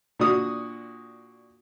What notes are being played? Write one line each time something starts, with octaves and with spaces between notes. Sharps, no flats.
A#2 D4 F#4 D#6